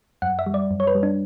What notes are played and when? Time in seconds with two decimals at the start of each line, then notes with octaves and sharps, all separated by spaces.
0.22 F#2 F#5
0.39 E5
0.46 G3
0.54 D5
0.71 F#2
0.80 C#5
0.87 B4
0.95 G3
1.03 D4